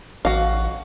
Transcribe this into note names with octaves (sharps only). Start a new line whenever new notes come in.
A1 F#4 F5